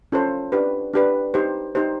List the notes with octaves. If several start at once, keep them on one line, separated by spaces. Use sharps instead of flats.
C#4 F4 A4 C5
D4 G4 B4
D4 G4 B4
D#4 G4 C5
D#4 G4 C5